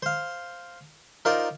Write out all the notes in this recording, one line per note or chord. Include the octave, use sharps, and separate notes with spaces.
C5 F5
D#4 F4 A#4 C5 D5 F5